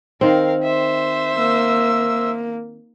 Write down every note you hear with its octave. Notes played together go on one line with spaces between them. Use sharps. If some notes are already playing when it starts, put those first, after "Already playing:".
D#3 C4 A#4 F5
C5 E5
A#3 E6